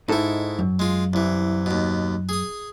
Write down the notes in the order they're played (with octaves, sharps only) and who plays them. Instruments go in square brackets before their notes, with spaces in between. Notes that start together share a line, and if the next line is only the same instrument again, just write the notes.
[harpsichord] G#2 E4 [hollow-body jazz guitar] D#4 A4
[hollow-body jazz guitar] F#2
[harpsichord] G#3 F4
C2 E3
D#2 B2
G#4 D#6